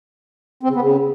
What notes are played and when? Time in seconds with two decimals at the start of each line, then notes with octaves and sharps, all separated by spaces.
0.63 C4
0.69 C#3
0.75 B3
0.82 C#3